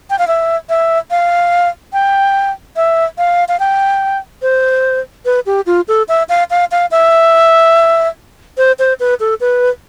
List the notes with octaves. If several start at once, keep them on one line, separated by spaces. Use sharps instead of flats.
G5
F5
E5
E5
F5
G5
E5
F5
F5
G5
C5
B4
G4
F4
A4
E5
F5
F5
F5
E5
C5
C5
B4
A4
B4